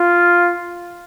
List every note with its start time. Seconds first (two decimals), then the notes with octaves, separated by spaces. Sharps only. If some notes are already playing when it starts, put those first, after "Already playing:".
Already playing: F4